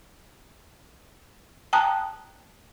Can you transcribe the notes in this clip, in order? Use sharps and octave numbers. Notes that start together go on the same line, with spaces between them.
G5 A5 A#5 D#6 F#6